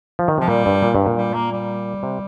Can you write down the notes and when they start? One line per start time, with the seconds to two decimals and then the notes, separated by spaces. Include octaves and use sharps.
0.19 F3
0.28 D#3
0.38 C3 F3
0.48 A#2 G3
0.66 G2
0.83 A#2
0.95 G2
1.06 A#2
1.17 G3
1.34 A#3
1.52 G3
2.03 C3